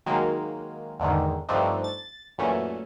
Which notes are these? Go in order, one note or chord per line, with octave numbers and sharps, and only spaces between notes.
D#3 F#3 G#3 A#3
E2 G#2 D3 D#3
G2 F3 A3 C4 D4 D#4
A6
F#2 A#2 E3 A3 C#4